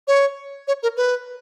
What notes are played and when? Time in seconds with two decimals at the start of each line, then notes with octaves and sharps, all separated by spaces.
0.08 C#5
0.68 C#5
0.83 A#4
0.97 B4